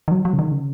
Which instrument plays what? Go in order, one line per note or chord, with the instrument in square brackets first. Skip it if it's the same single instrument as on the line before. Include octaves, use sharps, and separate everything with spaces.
[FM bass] D#3
F#3
F#3
C#3
D#3
C#3